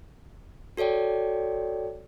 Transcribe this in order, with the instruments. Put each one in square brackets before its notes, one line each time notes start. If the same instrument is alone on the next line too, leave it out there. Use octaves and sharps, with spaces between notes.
[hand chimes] F#4 A4 C#5 D5 G5